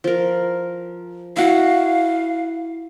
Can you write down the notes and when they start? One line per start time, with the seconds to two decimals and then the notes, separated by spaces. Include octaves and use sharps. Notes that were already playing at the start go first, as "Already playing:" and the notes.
0.04 F3 A#4
1.37 E4 F#4 F5